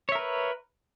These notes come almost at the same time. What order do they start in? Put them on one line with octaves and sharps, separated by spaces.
C#5 E5 A#4 B4